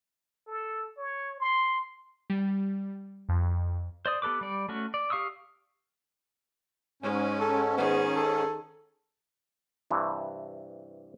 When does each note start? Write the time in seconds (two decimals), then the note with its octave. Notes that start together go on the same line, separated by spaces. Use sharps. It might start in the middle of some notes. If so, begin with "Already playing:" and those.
0.47 A4
0.97 C#5
1.40 C6
2.30 G3
3.29 F2
4.06 C5 D5 D#6
4.22 B3 G4 A4 B4 D6
4.41 G3 D5
4.69 A3 C#4 F#4
4.94 D5
5.10 G4 F5 C#6 D#6 E6
7.02 G#2 G#3 C#4
7.40 A4
7.77 D#3 B3 G#4
8.16 A4
9.91 G2 C3 E3